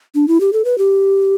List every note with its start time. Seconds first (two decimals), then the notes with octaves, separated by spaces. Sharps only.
0.15 D4
0.28 E4
0.41 G4
0.53 A4
0.65 B4
0.78 G4